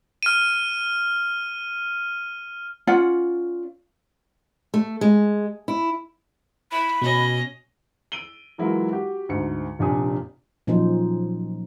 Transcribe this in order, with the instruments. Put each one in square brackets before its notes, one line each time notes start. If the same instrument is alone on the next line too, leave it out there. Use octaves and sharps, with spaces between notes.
[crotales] F6 D#7
[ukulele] C#4 F4 D5 F#5
[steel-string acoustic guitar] A3
G#3
E4
[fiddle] E4 [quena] B5
[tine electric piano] B2 [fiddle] C#4 D#5
[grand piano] E6 D7 D#7 G7
E3 F#3 G#3 E4 F4 A#4
F#4 G4
D2 G#2 C#7
F1 A#2 D4 G4 G#5 D#6
[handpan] A#2 F3 F#3 C#4 D#4 C5